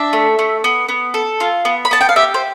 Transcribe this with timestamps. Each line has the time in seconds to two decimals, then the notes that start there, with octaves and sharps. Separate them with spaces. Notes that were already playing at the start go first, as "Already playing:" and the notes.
Already playing: D4 E5
0.13 A3
0.39 A3
0.64 B3
0.89 B3
1.14 A4
1.40 F4
1.65 B3
1.85 B5
1.91 B3 A5
2.01 G5
2.09 F5
2.16 G4 E5
2.34 C5